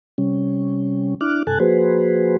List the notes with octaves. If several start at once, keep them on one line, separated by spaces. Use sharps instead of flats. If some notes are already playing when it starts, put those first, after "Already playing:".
C3 G3 C#4
D4 E4 D6 F6 F#6
G2 C3 A4 G#5 A5 F#6
F3 A#3 F#4 G#4 B4 C5